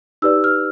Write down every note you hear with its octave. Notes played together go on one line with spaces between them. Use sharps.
D#4 G4 B4 D5 E6
F6